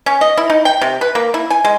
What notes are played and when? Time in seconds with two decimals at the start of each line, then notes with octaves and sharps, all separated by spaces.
0.06 C#4
0.21 D#5
0.37 E4
0.50 D#4
0.65 G5
0.82 C3
1.01 B4
1.15 A#3
1.34 E4
1.50 G#5
1.65 G#3